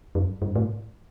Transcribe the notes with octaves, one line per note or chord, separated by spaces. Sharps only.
F#2
G2
A2